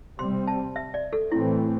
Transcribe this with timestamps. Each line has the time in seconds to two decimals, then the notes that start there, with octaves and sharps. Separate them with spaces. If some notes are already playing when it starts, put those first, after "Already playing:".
0.18 C3 G3 C4 C6
0.47 A5
0.76 E5
0.94 D5
1.13 A4
1.32 A2 E3 A3 C4 E4